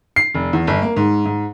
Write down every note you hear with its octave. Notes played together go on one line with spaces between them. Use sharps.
C7
F1
E2
G1
A#3
G#2
G#2